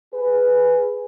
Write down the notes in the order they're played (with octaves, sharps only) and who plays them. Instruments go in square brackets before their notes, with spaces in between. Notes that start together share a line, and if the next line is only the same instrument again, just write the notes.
[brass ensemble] G#4 B4